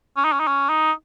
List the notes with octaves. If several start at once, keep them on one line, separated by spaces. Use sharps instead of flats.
C#4
D#4
C#4
D#4
C#4
D#4